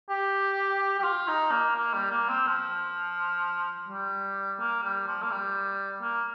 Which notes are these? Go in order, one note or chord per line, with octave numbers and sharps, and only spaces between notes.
G4
G4
F4
D#4
A#3
A#3
G3
A#3
C4
F3
G3
A#3
G3
F3
A#3
G3
A#3